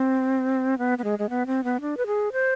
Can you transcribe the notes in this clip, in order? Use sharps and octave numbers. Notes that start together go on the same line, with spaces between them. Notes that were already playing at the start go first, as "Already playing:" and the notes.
Already playing: C4
B3
B3
G#3
G#3
B3
C4
B3
D4
B4
G#4
C5